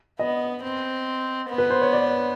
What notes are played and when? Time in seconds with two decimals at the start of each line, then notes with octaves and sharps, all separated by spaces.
0.19 B3 D#5
0.63 C4
1.49 B3
1.58 B4
1.70 C5
1.82 C#5
1.93 D5